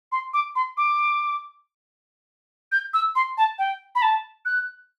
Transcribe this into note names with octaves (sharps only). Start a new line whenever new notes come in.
C6
D6
C6
D6
G6
E6
C6
A5
G5
B5
A5
F#6